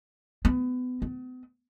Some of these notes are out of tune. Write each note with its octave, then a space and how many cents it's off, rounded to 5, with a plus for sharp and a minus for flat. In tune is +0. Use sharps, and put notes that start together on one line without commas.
B3 +25
B3 +45